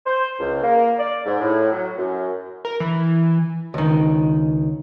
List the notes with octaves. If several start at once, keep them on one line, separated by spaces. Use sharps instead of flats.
C5
C#2
A#3
D5
G#2
A2
F#3
F#2
A#4
E3
C#2 D#3